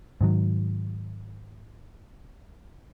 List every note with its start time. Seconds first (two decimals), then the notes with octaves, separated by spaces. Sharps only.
0.21 G#2 D#3 F#3